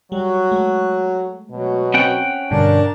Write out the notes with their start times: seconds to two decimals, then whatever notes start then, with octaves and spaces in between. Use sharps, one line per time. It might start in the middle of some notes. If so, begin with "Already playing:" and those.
0.12 F#3 G3 F#4
0.52 G#3 A3
1.51 B2 F#3
1.94 C4 C#4 F#5 G5
2.51 G2 B2 D3 D4 A#4 A5